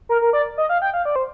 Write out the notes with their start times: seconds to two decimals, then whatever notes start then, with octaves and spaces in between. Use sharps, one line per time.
0.09 A#4
0.21 A#4
0.33 D5
0.58 D#5
0.69 F5
0.82 G5
0.94 F5
1.05 D5
1.16 C5